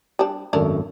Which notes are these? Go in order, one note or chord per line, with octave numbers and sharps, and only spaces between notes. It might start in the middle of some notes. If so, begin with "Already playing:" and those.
G3 D4
G#1 F#2 A3 D4 A#4